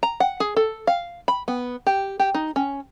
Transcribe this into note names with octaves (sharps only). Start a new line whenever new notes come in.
A#5
F#5
G#4
A4
F5
B5
B3
G4
G4
D#4
C#4